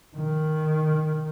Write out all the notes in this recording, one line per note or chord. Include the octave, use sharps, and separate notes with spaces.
D#3